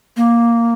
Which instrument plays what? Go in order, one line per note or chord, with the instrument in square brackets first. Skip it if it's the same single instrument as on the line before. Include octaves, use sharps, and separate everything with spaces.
[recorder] A#3